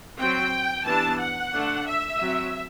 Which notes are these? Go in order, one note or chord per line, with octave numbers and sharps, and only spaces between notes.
F#3 C4 G5
E3 G3 B3 D4 A5
F#5
D3 A3 D4
E5
F#3 C4